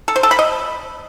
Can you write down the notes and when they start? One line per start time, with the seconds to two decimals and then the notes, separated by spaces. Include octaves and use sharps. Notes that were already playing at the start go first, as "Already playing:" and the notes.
0.08 A4
0.16 C5
0.23 A4
0.31 B5
0.39 D#5